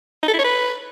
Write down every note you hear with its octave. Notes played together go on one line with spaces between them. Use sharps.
D#4
A4
E4
C#5
B4